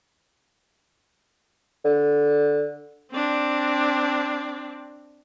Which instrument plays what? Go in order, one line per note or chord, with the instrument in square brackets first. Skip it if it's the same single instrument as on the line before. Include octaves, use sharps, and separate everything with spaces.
[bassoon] D3
[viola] C4 D4